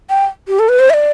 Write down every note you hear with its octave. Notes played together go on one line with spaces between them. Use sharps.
G5
G4
A4
B4
C5
E5
D5